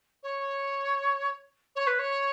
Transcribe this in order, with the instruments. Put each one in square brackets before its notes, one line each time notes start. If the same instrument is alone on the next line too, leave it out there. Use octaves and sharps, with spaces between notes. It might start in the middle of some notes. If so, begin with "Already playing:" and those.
[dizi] C#5
C#5
B4
C#5